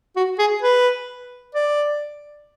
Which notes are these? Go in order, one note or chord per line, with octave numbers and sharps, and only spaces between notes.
F#4
G#4
B4
D5